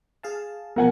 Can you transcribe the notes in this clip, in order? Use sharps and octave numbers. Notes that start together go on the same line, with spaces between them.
G#4 F5 A5
B2 F3 A#3 A#4 F#5 G#5